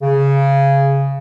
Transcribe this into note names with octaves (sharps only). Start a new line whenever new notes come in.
C#3